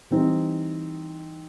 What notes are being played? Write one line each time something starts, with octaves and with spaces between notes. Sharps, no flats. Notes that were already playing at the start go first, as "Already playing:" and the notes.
E3 G3 C4 D#4